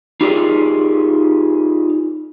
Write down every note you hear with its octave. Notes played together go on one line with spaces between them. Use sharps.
D#4 F4 G4 G#4 A#4 D5